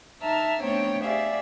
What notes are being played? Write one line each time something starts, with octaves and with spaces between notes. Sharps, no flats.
D#4 E5 A5 A#5 F6
A3 B3 C4 D4 C#5 G5
G4 G#4 D5 E5 F5